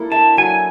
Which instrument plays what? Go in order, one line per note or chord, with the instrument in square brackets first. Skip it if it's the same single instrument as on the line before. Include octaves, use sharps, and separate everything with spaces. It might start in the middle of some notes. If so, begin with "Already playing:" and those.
Already playing: [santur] A#3 D4 E4 A4
[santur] E5 [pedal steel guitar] A5
[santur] F#3 [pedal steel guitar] G#5